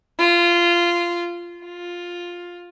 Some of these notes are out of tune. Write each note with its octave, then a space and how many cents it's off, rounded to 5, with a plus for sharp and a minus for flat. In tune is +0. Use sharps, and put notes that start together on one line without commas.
F4 -15
F4 +5